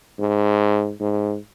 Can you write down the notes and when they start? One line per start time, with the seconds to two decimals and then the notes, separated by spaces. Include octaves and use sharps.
0.19 G#2
1.00 G#2